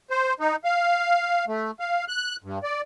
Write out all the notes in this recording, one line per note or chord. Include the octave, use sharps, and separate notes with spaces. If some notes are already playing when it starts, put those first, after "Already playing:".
C5
D#4
F5
A3
F5
F#6
G2
D5